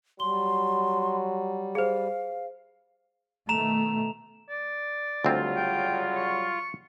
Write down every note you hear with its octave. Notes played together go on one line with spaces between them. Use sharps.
F#3 G3 C6 G7
G#4 C5 F5
B2 D#3 A3 A#5 E7 F7
D5
D2 C#3 F#3 G3 C4 F4
G5
C#6